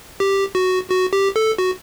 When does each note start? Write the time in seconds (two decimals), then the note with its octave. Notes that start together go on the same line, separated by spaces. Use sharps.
0.20 G4
0.55 F#4
0.90 F#4
1.13 G4
1.36 A4
1.58 F#4